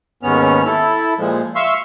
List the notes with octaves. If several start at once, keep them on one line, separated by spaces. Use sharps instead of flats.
D#2 G#2 B3 C#4 F6
E4 A4
A#2 F3 G#3
E5 F5 C6 C#6 E6